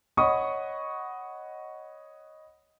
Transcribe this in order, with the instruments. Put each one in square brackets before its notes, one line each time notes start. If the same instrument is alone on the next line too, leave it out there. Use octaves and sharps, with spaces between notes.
[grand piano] C#5 D#5 F#5 B5 C#6 D#6